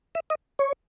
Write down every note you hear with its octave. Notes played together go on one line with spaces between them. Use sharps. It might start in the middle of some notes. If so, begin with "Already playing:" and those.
E5
D#5
C#5